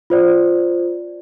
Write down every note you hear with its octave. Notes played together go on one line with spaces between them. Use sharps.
F4 C5 D5